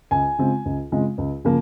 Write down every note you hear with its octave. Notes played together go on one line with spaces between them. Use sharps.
C#2 G#5
C#3 G#3 C4 F4
C#2
C#3 G#3 C4 F4
C#2
C#3 F3 A#3